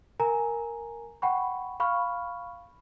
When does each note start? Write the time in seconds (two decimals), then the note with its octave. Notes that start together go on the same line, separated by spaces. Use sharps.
0.20 A#4 G#5 A#5
1.22 F#5 G5 B5 C#6
1.80 F5 B5 C#6 F6